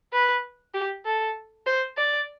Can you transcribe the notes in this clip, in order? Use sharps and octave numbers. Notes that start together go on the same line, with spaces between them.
B4
G4
A4
C5
D5